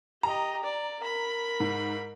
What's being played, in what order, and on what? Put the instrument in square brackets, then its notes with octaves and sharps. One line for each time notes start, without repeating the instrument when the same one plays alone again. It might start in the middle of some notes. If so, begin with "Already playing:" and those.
[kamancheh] G4 D#5 [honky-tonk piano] A#5
[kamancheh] D5
A#4 B5
[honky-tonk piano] G#2